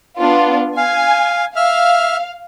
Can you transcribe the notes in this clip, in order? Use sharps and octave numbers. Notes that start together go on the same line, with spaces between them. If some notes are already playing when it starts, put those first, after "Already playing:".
B3 D4 F4
F5 G#5
E5 F5 F6